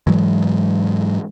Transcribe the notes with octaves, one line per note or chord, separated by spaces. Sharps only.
G#2 E3 F#3 G#3